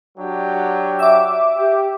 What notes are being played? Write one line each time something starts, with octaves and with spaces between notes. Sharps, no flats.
F#3 D4 G4
E5 D6
G4